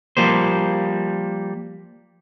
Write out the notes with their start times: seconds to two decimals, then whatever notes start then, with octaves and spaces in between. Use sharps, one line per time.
0.17 F3 G3 A#3 C5